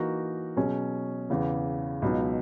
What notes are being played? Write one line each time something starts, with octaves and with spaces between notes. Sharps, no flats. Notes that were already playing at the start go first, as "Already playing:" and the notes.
Already playing: E3 A#3 D#4 F#4 A#4
B2 F#3 C#4 G#4
E2 C#3 E3
C#2 B2 F#3 B3 D#4